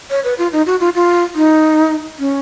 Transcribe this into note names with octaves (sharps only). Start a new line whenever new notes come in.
C#5
B4
F4
D#4
F#4
F4
F4
D#4
C#4